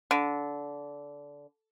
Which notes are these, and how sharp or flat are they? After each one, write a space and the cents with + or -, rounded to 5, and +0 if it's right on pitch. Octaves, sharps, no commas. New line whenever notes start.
D3 -20